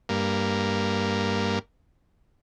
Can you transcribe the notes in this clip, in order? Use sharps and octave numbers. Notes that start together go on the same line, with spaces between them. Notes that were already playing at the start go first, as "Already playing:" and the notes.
G2 A#3